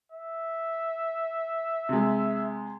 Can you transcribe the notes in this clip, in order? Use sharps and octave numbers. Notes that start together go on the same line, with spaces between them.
E5
C3 G#3